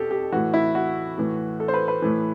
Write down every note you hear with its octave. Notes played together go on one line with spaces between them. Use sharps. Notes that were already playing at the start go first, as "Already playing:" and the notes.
Already playing: B2 G4 A4
G4
A2 E3 F#4
E4
F#4
A2 E3
A4
C5
B4
B4
A2 E3